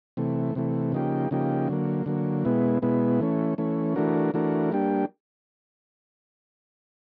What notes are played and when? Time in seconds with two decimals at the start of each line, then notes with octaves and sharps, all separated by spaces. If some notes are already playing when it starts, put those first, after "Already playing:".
0.17 C3 E3 A3
0.55 C3 E3 A3
0.92 C#3 F3 A#3 D#4 G4
1.31 C#3 F3 A#3 D#4 G4
1.68 D3 F#3 A#3
2.06 D3 F#3 A#3
2.45 B2 G#3 B3 E4
2.82 B2 G#3 B3 E4
3.20 E3 A3 C#4
3.58 E3 A3 C#4
3.96 E3 A3 D4 F#4 A#4
4.34 E3 A3 D4 F#4 A#4
4.72 G3 A#3 D4 G4